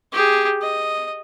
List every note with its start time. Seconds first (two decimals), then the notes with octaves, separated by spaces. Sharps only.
0.13 G4 G#4
0.62 D#5